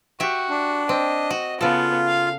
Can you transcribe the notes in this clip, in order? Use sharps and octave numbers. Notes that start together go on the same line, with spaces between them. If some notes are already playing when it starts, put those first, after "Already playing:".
F#4 G4 E5
D4
C4 D#5
F#4
C#3 B3 F4 A4
F5